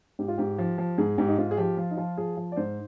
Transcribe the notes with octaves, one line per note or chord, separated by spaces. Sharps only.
G#2 G4
F4
G#2 G4
F3
F3
G#2 G#4
G#2 G4
D#4
G#2 F4
G#4
F3 G4
F3 F4
D#4
F3 F4
F3 G#4
F3
D5
G#2 C5